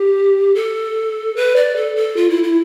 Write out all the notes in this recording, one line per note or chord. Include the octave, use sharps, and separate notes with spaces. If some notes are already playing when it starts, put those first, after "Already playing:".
Already playing: G4
A4
B4
D5
A4
A4
F4
E4
E4